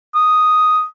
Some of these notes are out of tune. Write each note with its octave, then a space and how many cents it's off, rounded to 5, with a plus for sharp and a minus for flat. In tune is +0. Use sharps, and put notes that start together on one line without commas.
D#6 +0